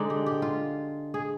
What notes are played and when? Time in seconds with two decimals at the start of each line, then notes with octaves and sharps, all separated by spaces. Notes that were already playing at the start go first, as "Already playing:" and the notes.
Already playing: D3 G#3 D#4 C5 D5
0.10 G4
0.26 G4
0.42 F4
1.14 G#4